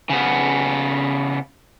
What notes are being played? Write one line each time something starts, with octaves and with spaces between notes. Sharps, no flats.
C#3 B3